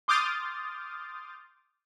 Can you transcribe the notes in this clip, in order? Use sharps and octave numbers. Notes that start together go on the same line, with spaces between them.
C6 D6 D#6 F6 G6 A6